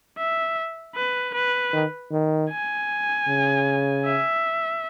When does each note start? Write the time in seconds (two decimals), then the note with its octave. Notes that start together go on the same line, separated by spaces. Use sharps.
0.18 E5
0.96 B4
1.34 B4
1.73 D#3
2.11 D#3
2.50 G#5
3.28 C#3
4.05 E5